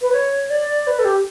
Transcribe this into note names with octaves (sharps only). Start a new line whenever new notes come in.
B4
C#5
D5
B4
A4
G4